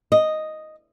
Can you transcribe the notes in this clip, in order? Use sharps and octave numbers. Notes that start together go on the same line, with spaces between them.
D#5